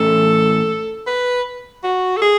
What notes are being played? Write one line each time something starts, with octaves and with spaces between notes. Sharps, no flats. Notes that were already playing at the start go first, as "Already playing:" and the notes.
Already playing: A2 E3 A3 C#4 G#4 A4
B4
F#4
A4
G#4